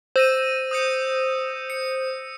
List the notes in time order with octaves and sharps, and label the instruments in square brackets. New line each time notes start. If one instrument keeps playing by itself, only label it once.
[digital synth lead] C5 [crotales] E6 A#6 D#7
[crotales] D#6 G6 C#7
C#7